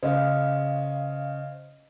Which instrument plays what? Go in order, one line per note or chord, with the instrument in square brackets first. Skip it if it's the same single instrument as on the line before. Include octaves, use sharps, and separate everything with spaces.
[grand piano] C#3 [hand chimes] C5 D#5 F5